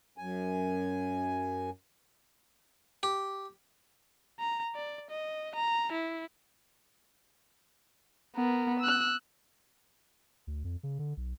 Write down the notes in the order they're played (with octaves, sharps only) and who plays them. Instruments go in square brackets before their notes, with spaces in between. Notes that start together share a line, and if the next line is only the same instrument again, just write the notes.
[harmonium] F#2 G#5
[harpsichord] G4
[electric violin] A#5
D5
D#5
A#5
E4
B3 A#4
E6 F#6
[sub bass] D2
F2
C#3
D3
B1